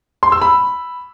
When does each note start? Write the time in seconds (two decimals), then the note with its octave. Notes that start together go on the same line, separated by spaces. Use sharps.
0.23 C6
0.32 E6
0.41 B5